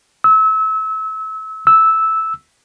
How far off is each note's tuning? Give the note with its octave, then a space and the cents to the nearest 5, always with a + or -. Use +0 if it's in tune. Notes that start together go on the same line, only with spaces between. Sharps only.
E6 -30
E6 -10